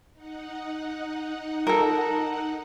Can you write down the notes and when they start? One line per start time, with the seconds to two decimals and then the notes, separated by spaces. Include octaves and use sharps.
0.13 D#4 F#5
1.67 A4 A#4